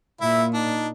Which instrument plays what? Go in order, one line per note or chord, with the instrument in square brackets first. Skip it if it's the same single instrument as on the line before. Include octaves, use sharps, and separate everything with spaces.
[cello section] A#2 [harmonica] E4 [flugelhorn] E5
[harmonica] D4 [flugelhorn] D#4